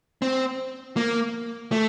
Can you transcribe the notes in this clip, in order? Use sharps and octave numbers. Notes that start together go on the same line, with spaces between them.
C4
A#3
A3